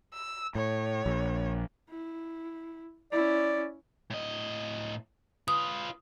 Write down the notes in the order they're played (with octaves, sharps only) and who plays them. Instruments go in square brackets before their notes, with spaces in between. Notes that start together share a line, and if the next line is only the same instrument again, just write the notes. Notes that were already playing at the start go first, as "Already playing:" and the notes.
[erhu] E6
[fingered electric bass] A2 [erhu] C#5
[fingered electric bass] A#1
[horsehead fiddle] E4
[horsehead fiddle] C#4 E4 [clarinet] D5
[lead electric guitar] A2 D#5
[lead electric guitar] F4 B4 [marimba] D#6